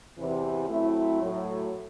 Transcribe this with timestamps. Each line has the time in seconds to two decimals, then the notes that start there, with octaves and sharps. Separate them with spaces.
0.17 E2 C3 E3
0.68 F#3 A3 C4 E4
1.21 A2 F#3 A3